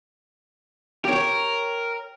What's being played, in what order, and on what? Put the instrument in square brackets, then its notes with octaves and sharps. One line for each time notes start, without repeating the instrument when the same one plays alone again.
[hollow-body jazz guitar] G4 C#5 [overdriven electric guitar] A#4